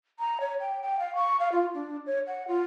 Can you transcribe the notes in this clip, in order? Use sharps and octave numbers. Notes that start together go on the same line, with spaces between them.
A#5
C#5
G5
G5
F5
C#6
F5
F4
D4
C#5
F#5
F4